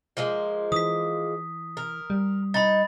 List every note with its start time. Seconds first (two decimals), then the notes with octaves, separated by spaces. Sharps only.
0.17 F3 G#3 A#3
0.72 E3 D#6 B6
1.77 A#4
2.10 G3
2.54 D#4 B5 A6